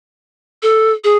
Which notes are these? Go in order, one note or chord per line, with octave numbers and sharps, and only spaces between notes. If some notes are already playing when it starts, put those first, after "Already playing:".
A4
G#4